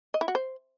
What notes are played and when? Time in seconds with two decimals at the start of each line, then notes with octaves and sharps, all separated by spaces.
0.14 D#5
0.21 E4
0.28 F#4
0.35 C5